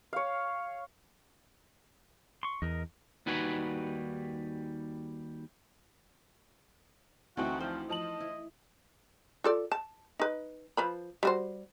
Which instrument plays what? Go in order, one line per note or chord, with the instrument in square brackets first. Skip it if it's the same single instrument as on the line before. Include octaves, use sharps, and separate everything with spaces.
[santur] C#5 F5
[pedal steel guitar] C6 C#6
[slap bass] E2 [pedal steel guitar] A#4 D#5
[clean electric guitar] D#2 G3 D#4 F#4 B4 G#5
[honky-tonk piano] D2 C4 G5 [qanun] E3 A3 D#4 [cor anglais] F#4
[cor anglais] F3 [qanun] C5
[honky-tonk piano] F3 A5 F#7 [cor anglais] D#5
[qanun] E4
[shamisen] F4 A4 D5
A5
D#4 B4
F3 B4 B5
G3 F#4 C5